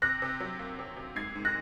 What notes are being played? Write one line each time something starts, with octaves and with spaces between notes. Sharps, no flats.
C3 F#6 A#6
C3
F#3
A#3
C3
C3
G#2 G#6 C7
G#2
F#6 A#6